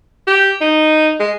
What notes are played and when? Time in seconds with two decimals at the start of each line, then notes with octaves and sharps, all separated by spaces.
0.27 G4
0.61 D#4
1.20 G#3